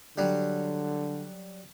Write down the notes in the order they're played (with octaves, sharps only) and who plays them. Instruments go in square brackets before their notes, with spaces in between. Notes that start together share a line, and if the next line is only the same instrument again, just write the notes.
[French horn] D3 [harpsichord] F#3 G3